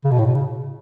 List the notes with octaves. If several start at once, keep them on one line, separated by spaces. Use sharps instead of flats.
C#3
B2
A2
B2
C#3